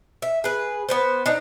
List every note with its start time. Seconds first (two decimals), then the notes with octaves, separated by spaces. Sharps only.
0.22 E5
0.44 G#4 B4
0.89 B3 B4 C5
1.26 D4 D#4 A#5